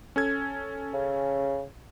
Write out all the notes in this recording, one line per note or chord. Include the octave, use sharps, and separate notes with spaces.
C#4 A4 G#6
C#3